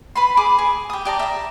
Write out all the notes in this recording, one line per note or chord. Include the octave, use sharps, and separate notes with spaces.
B4 B5 C6
G#4 D6 D#6
G#4
G4 D#6
G4 D5 A5 A#5
E5 A#5